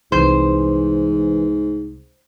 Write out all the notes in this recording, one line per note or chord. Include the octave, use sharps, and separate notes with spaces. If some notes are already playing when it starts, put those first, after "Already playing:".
C2 G#2 E3 E4 C5